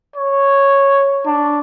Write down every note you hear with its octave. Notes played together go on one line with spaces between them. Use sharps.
C#5
D4